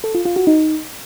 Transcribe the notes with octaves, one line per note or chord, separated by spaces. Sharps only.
A4
F4
F4
F#4
D#4